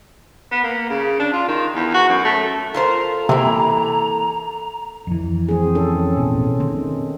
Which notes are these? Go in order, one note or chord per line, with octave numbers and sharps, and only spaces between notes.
B3
A#3
C#3
D4
F4
D#3
E2
F#4
F#2
A3
F4 A4 A#4 C5 A#5
C3 E3 A#3
F2 E3
C4 G#4
C#4 A4
A1 B2 E3
D#3 C4